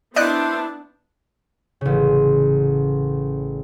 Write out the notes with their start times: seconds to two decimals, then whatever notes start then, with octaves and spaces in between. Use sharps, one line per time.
0.16 B3 D4 E4 C5 D5 D#5 F#6
1.81 A1 C#3